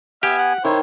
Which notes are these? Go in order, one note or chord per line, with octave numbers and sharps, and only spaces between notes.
B3 G4 E5 G#5 F6
F#5
D#3 E4 C5 C#5